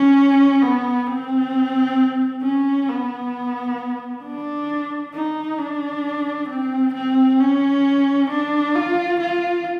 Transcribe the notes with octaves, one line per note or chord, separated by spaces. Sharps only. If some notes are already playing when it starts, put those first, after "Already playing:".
Already playing: C#4
B3
C4
C#4
B3
D4
D#4
D4
C4
C4
C#4
D4
F4
F4